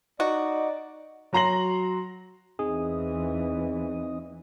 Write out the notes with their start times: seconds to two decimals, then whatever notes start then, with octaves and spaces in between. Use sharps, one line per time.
0.20 D#4 F#4 D5
1.33 F#3 F#4 A#5 C6 A#6 F#7
2.59 E2 E3 C4 D#4 G#4 D#5